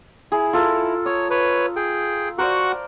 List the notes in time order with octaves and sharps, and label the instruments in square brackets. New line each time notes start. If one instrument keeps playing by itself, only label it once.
[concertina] E4 [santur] G#4
[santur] F4 A4 A#4
[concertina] C#5 [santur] D#6
[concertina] B4 C#5
G#4 G5
[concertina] F#4 F#5 C#6 [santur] A#4 C5 D5